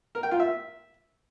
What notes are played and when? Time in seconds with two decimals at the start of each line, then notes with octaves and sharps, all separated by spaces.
0.15 A#4
0.23 G5
0.31 F4
0.40 E5